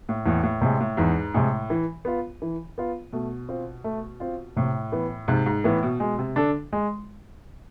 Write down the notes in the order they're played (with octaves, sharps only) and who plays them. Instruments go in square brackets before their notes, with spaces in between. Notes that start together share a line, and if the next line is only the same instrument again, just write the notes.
[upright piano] A2
[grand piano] E2 [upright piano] A2
[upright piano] A2
[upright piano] A2 [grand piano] C3 G#3
[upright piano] A2
[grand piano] E2 [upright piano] G#2
[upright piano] A2 [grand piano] C3 G#3
[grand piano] E3
B3 F4
E3
B3 F4
[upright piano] B2 [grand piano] A3
[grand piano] C4 F4
A3
C4 F4
[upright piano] A2 [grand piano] C3
[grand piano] E3 B3
[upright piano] G#2 [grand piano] C3
[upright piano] G#2
[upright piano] A2 [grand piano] E3 B3
[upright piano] B2
[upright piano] B2 [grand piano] G#3
[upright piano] C3
[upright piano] D3 [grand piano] D4 A4
[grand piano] G#3